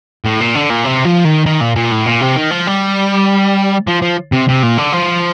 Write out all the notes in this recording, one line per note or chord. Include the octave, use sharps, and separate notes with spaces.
A2
A#2
D3
A#2
C3
F3
D#3
D#3
A#2
A#2
A2
A#2
C3
D#3
F3
G3
F3
F3
C3
C3
A#2
D3
F3